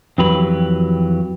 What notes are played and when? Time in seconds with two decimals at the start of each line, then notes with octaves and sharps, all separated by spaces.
0.18 F2 E3 F#3 G4 B4 B5